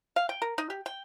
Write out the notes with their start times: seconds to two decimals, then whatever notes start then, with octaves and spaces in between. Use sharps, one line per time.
0.16 F5
0.29 G5
0.42 A#4
0.58 D#4
0.70 G4
0.86 G5